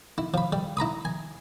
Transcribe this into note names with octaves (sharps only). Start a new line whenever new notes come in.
E4
F3 B5
G3
E4 A#5 B5 D#6
G#5